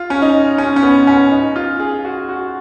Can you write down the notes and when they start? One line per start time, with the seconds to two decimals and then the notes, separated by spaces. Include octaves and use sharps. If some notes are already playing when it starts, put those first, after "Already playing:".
Already playing: F4
0.10 C#4
0.22 D#4
0.58 C#4
0.76 C#4
0.83 B3
1.07 C#4
1.31 D#4
1.56 F4
1.80 G#4
2.05 F#4
2.29 F#4